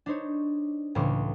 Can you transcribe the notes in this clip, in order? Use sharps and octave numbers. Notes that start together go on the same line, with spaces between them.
D4 D#4 C5 C#5
C#2 A2 E3 C5 C#6 D6